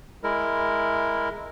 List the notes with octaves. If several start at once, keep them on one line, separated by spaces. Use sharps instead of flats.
G#3 E4 A#4